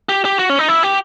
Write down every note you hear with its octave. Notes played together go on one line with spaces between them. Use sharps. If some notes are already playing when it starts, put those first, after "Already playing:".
G4
G4
F#4
C#4
D#4
E4
G4